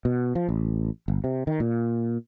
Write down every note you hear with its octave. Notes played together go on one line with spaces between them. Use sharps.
B2
F3
A1
G1
C3
D#3
A#2